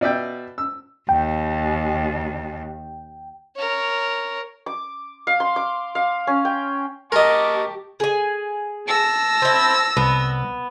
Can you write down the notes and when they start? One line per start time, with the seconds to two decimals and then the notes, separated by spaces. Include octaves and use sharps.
0.01 B2 D5 E5 G5
0.58 E6
1.09 D#2 G5
3.56 A#4 C#5
4.66 D6
5.27 F5
5.40 C6
5.56 D6
5.95 F5
6.27 C#4
6.45 G5
7.12 G4 A#4 D#5 A5 C#6 D6
8.00 G#4 G#5
8.88 A5 E6 A#6
9.42 C4 E4
9.97 C2 B3